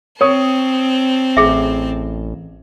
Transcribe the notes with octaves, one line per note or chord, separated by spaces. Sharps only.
C4 C#5 A5 D#6
A1 G#4 E5